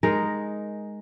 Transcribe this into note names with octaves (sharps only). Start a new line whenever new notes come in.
G#3 D#4 A#4